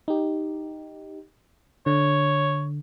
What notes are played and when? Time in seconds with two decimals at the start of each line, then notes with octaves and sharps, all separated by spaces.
0.08 D#4 G4
1.86 D3 C#5